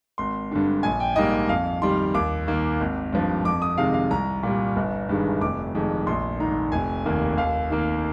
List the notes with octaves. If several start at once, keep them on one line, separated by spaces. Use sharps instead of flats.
G#1 C6
G2 D3
A#1 G#5
G5
G#2 G3 A#3 D#5
F2 F5
D#3 G3 C6
D#2 D6
D#3 A#3
G#1
G2 F3
F2 D6
D#6
C3 D#3 G#3 F5
F5
C2 A#5
A#2 G3
G1
G2 D#3 G#3
F1 D6
F2 D#3 G#3
A#1 C6
G#2 D#3 A#5
F1 G#5
D#2 D#3 A#3
D#2 F5
D#3 A#3